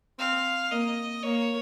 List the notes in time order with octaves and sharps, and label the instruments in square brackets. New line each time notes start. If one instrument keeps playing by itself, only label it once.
[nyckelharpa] C4 [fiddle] F5
[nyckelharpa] A#3 [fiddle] D#5
[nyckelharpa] A#3 [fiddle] C#5